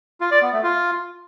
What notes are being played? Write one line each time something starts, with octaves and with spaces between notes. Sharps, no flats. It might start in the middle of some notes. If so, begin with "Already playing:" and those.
F4
D5
B3
A3
F4